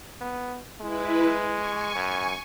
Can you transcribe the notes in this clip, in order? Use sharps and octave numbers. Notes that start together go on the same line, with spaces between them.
B3
G#3 E4 B4
G#5 C#6
F#2